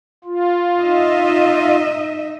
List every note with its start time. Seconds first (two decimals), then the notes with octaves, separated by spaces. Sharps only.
0.24 F4
0.80 D#4 D#5 E5